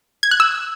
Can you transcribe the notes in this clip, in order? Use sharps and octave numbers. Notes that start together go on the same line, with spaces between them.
G#6
F#6
E6